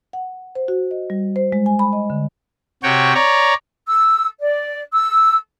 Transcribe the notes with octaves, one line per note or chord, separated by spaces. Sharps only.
F#5
C5
F#4
D#5
G3
C5
G#3
G#5
B5
D#5
D3
C3 F#4 C#5 G5
C#5 D5 A#5
E6
D5
E6